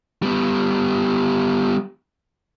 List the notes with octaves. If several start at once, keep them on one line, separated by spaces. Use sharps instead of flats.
G3 B3